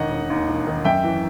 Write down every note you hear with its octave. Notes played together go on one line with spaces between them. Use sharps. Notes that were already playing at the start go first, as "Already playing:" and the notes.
Already playing: E1 D#3 D#5 F#5
E1
D#2
E1
D#3
F#2 E5 G5
E3